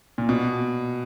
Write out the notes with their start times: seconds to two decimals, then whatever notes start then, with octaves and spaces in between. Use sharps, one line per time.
0.18 A#2
0.29 B2